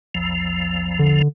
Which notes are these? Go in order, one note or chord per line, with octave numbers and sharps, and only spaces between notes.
A#1 E2 F3
D3